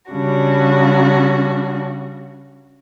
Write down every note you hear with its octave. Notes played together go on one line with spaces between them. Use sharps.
C#3 G3 D4 F#4